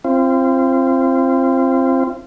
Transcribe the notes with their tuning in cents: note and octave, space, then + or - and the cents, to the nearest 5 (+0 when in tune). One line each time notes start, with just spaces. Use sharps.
C4 +15 F4 -30